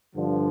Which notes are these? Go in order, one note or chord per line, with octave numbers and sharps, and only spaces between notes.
G2 D3 F3